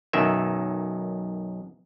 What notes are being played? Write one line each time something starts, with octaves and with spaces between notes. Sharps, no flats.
B1 F#2 D#3 E5